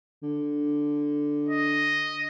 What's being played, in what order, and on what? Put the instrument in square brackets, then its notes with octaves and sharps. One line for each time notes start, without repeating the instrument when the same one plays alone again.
[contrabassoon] D3
[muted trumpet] D#5